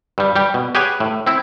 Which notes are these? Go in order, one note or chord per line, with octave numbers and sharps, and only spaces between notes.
G2 G3
G3 G4
B2
G4 G#4 B4 C#5 F#5 G#5
A2
C4 E4